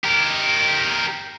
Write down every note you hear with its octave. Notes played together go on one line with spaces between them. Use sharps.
G4 A#4